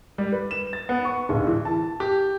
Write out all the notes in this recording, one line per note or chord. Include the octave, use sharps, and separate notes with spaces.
G3
B4
E7
A6
B3
C#6
D1
E3
A5
G4